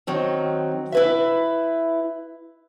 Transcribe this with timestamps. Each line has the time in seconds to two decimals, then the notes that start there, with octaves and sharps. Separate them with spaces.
0.07 D#3 F#3 C4
0.92 E4 B4 E5